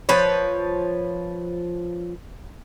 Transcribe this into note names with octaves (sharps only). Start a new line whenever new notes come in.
F3 B4 C#5